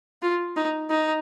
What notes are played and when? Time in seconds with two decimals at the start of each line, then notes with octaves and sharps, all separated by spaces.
0.22 F4
0.56 D#4
0.90 D#4